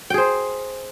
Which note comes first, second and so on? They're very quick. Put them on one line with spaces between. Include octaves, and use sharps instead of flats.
G5 G#4 C5